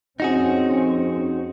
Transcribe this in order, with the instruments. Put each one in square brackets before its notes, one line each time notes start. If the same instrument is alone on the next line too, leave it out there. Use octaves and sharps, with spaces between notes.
[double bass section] F2 C4 C#4 [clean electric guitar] D#4 F#4 G#4